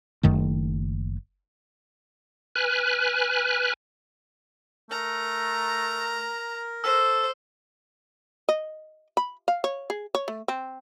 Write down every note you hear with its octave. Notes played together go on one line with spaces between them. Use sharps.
F#1 F#2 D#3 A3
B4 G#5 F6 F#6
A3 A#4 A#5
A4 C5 E6
D#5
B5
F5
C#5
G#4
C#5
A3
C4